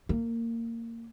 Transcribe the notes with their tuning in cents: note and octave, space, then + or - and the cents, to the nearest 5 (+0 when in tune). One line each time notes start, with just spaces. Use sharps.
A#3 -20